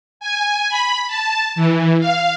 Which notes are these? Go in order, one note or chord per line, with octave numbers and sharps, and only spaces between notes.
G#5
B5
A5
E3
F5